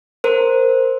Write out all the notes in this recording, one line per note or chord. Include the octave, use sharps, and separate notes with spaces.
A#4 C5